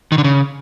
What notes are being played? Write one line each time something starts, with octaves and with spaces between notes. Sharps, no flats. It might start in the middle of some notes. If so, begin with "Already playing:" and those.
D#3
D3
C#3